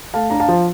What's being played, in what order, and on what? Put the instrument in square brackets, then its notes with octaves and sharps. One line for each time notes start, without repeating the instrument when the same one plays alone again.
[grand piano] A3 F5 A5
D4 A#5
F5 A5
F3